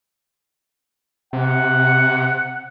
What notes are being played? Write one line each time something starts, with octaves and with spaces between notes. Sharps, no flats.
C3 F#5